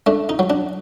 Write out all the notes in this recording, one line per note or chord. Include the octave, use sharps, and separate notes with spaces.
A3 D4
D#4
F#3
D4